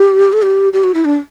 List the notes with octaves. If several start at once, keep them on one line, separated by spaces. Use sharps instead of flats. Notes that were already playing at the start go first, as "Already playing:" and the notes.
Already playing: G4
A4
G4
G4
F#4
E4
D4